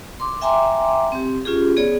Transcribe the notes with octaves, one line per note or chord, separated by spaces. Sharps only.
C6 D6
E5 G5 G#5 A#5 C6 D6
C4 G4
C#4 F4 G4 G#4
B3 G#4 C#5 D5